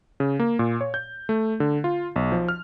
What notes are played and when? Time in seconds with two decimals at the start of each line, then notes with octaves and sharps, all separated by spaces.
0.20 C#3
0.39 A#3
0.59 A#2
0.81 C#5
0.94 G6
1.29 A3
1.60 D3
1.84 F4
2.16 B1
2.32 F3
2.49 F6